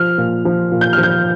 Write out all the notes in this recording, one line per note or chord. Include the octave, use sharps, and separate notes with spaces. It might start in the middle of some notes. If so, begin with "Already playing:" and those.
Already playing: F3 F6
A#2
F3
A#2
G6
F3 F6
G6